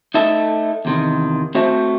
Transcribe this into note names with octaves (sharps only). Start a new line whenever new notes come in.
A3 D#4 A4 E5
E2 C3 D#3
A3 C4 F#4 C5 E5